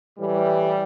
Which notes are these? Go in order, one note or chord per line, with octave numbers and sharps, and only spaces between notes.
A2 E3 G3